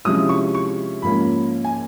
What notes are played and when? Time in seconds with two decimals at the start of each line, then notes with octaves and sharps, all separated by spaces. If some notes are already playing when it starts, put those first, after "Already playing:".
0.05 C3 F3 G#3 C#4 E4 D#6
0.29 C#6
0.55 C#6
1.02 G#2 F3 A#3 C#4 F4 B5
1.65 G#5